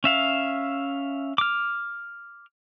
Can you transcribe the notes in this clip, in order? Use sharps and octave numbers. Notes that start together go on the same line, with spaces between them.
C#4 E5 F5
D6 F6